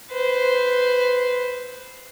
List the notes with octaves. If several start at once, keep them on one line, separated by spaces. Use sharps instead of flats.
B4 C5